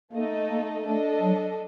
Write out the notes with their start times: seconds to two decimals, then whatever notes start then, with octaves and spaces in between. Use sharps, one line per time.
0.12 A3 A#3 D#4 A4 D#5
0.49 A#3
0.85 A3 D4 A4 D#5
1.21 F#3